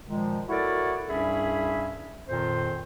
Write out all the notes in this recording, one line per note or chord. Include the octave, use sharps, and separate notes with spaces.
A#2 D#3 F3 G#3
E4 F#4 A4 A#4 C#5 D5
C2 G2 C#4 G#4 E5 B5
F2 A#2 D#3 C5